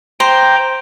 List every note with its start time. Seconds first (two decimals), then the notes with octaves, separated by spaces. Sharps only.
0.20 C5 G5 A#5 D6